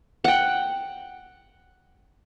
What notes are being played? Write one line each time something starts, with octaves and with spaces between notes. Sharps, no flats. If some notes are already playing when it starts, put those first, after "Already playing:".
F#5 G5